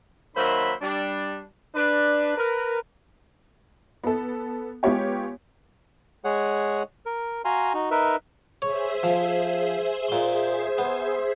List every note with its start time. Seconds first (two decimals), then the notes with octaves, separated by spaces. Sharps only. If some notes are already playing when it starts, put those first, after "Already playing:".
0.35 D#3 F#3 A#3 C5 E5 B5
0.81 G3 D4
1.75 D4 B4
2.37 A#4 B4
4.04 B3 A4
4.83 G#3 B3 F4 G4 C#5 G5
6.24 G#3 G#4 C#5 F#5
7.06 A#4
7.45 F#4 F5 G#5 A#5 C6
7.74 D#4 F#4
7.91 D#4 A#4 B4 E5
8.62 G#4 C5 C#5 E5
9.03 F3
10.08 A#2 C6
10.78 B3